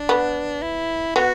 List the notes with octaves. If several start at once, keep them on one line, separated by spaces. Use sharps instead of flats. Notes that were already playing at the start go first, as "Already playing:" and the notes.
Already playing: D4
B3
E4
B3 F#4